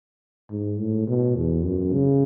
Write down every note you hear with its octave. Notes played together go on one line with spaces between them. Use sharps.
G#2
A2
B2
E2
F#2
C#3